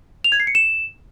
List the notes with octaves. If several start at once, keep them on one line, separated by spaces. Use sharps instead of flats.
F7
G#6
C7
C#7
E7